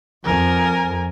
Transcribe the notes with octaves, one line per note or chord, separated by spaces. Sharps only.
F2 A#4 G#5